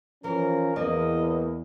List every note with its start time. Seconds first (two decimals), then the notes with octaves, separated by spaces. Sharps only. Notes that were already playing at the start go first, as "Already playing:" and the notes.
0.24 E3 F3 C#4 A#4
0.76 E2 A#3 D#5